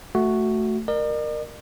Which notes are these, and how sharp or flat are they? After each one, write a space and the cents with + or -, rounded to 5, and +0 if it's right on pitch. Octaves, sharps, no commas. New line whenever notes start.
A3 +0 F#4 +0
A#4 +0 D5 +45